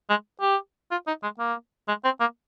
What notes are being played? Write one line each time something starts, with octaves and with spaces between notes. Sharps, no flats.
G#3
G4
F4
D#4
G#3
A#3
G#3
C4
A#3